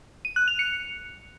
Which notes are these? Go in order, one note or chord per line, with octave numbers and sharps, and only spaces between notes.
D#7
F#6
F7
C#7